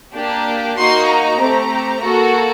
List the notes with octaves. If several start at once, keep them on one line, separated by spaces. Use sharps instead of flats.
A#3 D4 G4
A#3 D#4 F#4 C6
A#5
A3 C4 G4
A#3 F#4 A4